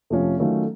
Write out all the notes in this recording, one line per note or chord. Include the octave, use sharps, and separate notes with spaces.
F2 C3 F3 A3 C#4
D#3 F#3 A3 C#4 F4